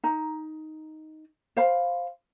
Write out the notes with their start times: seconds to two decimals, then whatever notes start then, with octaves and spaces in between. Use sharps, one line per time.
0.04 D#4 A#5
1.57 C5 F5 B5